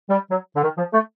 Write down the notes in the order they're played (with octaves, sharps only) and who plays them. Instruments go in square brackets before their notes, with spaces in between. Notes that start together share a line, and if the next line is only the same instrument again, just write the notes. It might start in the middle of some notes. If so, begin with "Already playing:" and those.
[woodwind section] G3
F#3
D3
D#3
F3
A3